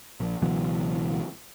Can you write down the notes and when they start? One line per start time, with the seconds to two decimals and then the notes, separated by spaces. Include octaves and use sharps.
0.20 A#1
0.42 C#2 B2 E3 F#3